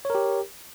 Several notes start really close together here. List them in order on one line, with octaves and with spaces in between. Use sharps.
C#5 A#4 G4